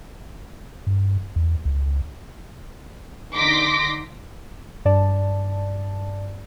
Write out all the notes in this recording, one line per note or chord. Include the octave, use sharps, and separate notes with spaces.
G2
E2
C#2
D3 D#4 C6 D6 A#6 B6
G2 D5 A5